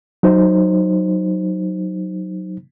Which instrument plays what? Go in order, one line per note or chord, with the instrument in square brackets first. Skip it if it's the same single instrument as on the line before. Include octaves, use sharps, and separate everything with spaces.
[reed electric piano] F#3 D#4 C5